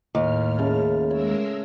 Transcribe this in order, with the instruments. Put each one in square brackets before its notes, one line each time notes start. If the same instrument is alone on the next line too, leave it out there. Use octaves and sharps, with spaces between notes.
[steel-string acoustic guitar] D#2 [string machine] A2 F6
[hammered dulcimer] C#3 A3 A5
[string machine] G#3 A#4 E6 [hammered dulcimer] C#5